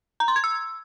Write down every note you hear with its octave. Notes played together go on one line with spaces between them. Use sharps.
A#5
C6
G#6
E6